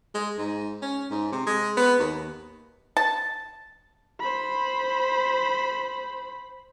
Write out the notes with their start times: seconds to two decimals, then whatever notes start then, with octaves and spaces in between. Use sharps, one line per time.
0.15 G#3
0.38 G#2
0.82 C#4
1.11 G#2
1.32 C3
1.47 G#3
1.77 B3
1.99 D#2
2.97 A5
4.20 C5 B5